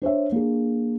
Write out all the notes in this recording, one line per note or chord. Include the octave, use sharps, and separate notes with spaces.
D4 C5 C#5 E5
A#3 D4 G#4